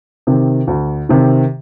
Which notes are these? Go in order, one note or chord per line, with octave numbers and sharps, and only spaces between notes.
C3 D#3
D2
C3 D#3